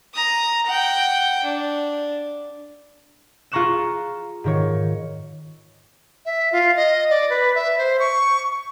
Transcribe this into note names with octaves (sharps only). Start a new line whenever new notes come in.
A#5 D#6
F#5 G5
D4
F4 G#4 A#5 C#6 F#6 E7
G#2 D#3 C#5
E5
F4
D#5
D5
B4
E5
C5
C#6